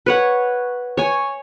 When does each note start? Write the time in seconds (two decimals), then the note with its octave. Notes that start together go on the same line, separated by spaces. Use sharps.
0.06 B4 C#5 F#5
0.97 C#5 G#5